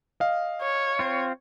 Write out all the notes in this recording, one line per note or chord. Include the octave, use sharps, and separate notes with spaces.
D#5 F5
C#5
C4 F4